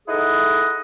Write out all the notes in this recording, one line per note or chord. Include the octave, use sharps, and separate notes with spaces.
D#4 E4 G#4 A4 D#5 F#5